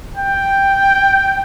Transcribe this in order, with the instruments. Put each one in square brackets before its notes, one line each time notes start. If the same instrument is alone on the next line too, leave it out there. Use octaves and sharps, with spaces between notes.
[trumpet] G5